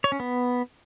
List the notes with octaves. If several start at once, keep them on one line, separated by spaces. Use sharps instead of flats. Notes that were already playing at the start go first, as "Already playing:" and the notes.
C#5
C#4
B3